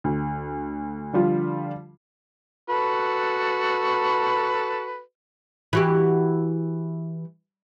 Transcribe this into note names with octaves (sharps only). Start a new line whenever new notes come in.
D2
D3 F3 G3 F4
F#4 A4 B4
E3 F#4 G4